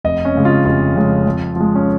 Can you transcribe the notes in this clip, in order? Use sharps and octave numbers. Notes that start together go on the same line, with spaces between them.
F1 D#5
C#4
F2 C#3 G#3
F4
F1 F4
F2 C#3 G#3
F2
F3 G#3
C#4